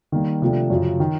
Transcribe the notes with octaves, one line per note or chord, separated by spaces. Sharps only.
D#3 G3 A#3
C3 F3 A3 D4
F#2 C#3 F3
D#3